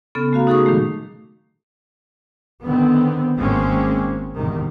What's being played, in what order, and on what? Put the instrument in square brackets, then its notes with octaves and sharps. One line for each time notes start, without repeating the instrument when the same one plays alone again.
[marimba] C#3 B3 C#4 A4
A3 F#4 F5 A#5
D#4 F#4 G#4 A4 C#6 D#6
A#2 D#3 F#3 G#3 A3
[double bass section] D3 D#3 B3 C4
G#1 G#2 G#3 A#3 C4 C#4
E2 G#2 C3 D#3 G3